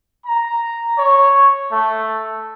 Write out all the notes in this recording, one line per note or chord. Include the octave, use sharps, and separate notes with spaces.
A#5
C#5
A3